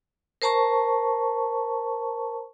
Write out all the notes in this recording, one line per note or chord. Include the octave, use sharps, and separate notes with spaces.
A#4 C5 A5 A#5 C#6